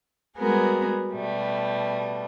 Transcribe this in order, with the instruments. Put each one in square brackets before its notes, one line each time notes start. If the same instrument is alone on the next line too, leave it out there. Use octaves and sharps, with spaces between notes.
[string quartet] G3 G#3 B3 F#4 G#4 A#4
B2 G3 A3